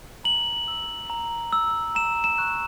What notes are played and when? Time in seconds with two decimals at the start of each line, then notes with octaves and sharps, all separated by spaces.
0.24 A#5 F#7
0.68 E6
1.10 A#5
1.53 E6
1.95 A#5 E7
2.24 E7
2.38 C#6 F#6